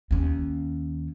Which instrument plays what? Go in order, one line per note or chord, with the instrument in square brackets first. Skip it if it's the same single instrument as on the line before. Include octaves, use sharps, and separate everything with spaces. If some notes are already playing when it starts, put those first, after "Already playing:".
[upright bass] D#2 C#4